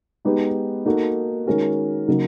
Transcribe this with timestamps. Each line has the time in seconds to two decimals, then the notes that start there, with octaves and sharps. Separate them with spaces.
0.25 G#3 B3 D#4 G4 B4
0.86 A#3 D#4 F#4 A4
1.47 D#3 G#3 C#4 F#4 A#4
2.08 C#3 F#3 A#3 D#4